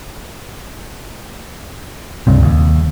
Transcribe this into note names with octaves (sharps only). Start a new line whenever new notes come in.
C#2 G2 C3
D#2